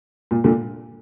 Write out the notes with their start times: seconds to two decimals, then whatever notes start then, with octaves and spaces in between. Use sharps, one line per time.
0.31 A#2
0.44 A#2 D3